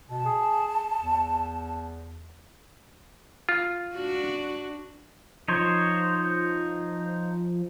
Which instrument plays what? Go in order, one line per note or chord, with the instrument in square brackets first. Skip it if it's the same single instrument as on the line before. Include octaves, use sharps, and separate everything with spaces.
[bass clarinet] B2 [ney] A5
[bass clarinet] G#4
E2
[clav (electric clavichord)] F4
[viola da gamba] D4 F#4
[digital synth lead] F3 [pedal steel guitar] D#4 C5 C#5